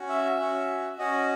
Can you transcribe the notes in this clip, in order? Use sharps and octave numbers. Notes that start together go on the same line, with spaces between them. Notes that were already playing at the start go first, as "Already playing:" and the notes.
Already playing: C#4 F#4
E5
C#4 F#4
C#4 F#4 D#5